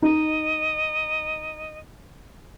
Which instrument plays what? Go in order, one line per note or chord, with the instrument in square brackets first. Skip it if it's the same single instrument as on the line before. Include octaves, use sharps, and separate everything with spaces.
[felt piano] D#4 [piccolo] D#5